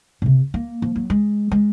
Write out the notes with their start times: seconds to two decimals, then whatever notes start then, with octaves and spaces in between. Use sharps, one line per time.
0.22 A#2
0.26 C3
0.54 A#3
0.82 F3
0.96 F#3
1.10 G#3
1.51 G#3